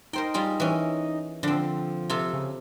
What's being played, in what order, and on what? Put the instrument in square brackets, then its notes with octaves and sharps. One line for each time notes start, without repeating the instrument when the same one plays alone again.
[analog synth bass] D#4 [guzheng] A#4 C5 G5
[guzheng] G3 F4 G#4
E3 C#4
[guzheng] D3 C4 [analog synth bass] F3
[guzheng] C3 F4 A4
[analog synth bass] C#3